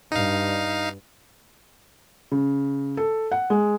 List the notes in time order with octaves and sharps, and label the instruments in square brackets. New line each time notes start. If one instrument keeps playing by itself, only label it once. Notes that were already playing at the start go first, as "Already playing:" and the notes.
[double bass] G2 [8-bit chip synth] D#4 F5
[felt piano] C#3
A4
F#5
G#3